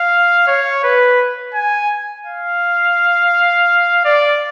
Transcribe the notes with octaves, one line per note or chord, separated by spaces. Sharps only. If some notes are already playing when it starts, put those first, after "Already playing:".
Already playing: F5
C#5
B4
G#5
F5
D5